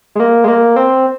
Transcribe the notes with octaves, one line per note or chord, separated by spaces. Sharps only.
G#3
A#3
G#3
A#3
C4